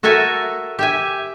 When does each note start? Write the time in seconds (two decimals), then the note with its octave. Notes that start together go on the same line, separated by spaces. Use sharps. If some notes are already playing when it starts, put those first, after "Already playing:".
0.03 F#4 A4 A#4 E5 G#5
0.79 G4 E5 G#5